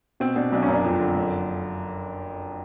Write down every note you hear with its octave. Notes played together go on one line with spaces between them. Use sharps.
B2 C4
B2 D4
B1 D4
C#4
F#1 D4
F2
D3
F#1